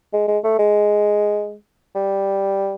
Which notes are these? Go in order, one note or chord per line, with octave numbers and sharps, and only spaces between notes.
G#3
G#3
A3
G#3
G3